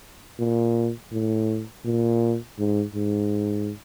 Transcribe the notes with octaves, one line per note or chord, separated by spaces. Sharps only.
A#2
A2
A#2
G#2
G#2